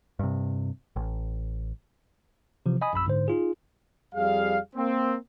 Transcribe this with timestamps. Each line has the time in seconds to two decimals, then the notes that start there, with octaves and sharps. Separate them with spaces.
0.19 G2 C3
0.96 A1
2.66 C3 E3 F3
2.81 D#5 G#5 B5 D#6
2.93 A#1 F#2 B5 E6
3.06 G#2 D3 C5
3.28 D#4 F4 G#4
4.15 F2 G3 G#4 F5
4.76 A#3 C4